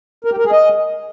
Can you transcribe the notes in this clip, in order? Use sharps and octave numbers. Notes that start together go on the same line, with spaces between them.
A#4
G4
A#4
G#4
D#5